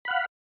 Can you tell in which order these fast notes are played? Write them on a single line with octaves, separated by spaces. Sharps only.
B5 F#5 F5